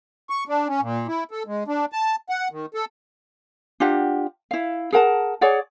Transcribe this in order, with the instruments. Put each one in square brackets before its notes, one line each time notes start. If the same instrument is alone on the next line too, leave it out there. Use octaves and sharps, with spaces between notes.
[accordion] C#6
D4
C#4
A#2
E4
A4
G#3
D4
A5
F#5
D#3
A4
[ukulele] D4 F4 G4 F#5
E4 F5
G#4 A#4 F#5 A5
G#4 C#5 D5 F#5